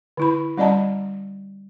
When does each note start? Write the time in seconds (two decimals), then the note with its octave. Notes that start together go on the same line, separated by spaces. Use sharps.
0.17 D3 E4 B5
0.57 G3 C#4 D5 D#5 A5 A#5